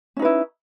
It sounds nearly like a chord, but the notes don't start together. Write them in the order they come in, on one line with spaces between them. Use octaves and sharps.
C#4 D#4 B4 E4